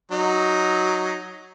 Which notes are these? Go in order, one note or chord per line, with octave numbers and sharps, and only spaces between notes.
F#3 D#4